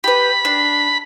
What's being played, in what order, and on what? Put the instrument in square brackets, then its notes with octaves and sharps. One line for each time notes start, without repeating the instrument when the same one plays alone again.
[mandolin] G4 B4 [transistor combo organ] B5
[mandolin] D4